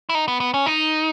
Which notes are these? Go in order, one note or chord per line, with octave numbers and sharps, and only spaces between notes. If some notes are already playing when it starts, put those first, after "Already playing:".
E4
D#4
B3
B3
C#4
D#4